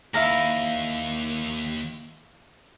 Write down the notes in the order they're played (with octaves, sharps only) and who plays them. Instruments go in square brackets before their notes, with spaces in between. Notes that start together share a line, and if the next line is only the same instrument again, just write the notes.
[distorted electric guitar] D#2 [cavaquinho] E4 F5 A#5